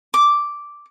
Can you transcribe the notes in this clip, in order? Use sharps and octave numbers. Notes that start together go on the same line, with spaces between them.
D6